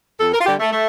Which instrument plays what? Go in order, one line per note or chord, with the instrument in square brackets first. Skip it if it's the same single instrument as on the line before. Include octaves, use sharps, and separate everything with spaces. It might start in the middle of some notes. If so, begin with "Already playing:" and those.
[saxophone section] F2 A4
A#4
F4
D3 G3 G4
A3
A3